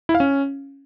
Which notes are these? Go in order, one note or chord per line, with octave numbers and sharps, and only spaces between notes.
E4
F5
C#4